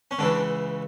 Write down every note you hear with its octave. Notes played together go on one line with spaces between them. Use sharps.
C#4
C#2 C#3 E3 D4